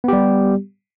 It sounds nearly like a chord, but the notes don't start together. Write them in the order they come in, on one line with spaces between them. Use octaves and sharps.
B3 G4 G3